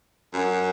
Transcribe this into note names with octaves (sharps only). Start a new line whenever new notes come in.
F#2